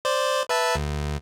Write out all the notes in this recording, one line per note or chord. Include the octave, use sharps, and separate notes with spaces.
C5 D5
B4 E5 A5
D2